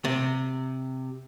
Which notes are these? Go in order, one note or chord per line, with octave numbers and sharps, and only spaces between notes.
C3